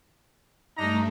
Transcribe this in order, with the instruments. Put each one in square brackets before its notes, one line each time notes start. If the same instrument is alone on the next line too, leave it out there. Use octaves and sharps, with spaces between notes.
[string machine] G2 A3 [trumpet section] D4 D#4 A#5